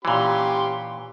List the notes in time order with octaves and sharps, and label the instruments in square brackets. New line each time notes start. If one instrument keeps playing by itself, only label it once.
[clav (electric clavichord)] A#2 E3 [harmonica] C#4 G4 C6